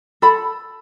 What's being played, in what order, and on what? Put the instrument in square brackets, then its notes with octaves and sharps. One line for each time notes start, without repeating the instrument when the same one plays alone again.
[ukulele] A4 B5